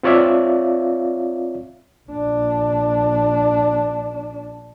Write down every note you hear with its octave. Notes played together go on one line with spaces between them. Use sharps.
C4 F4 C#5 D5 E5 F5
A#1 D4